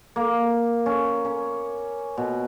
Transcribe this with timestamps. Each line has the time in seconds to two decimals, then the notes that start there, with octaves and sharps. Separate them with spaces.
0.16 A#3
0.86 C#4
1.25 C#4
2.17 B2